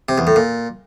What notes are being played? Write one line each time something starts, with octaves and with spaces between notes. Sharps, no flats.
C3
E2
A2
A#2